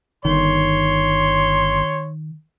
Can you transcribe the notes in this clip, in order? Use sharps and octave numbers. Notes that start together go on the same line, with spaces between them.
G1 D#3 C#5 C6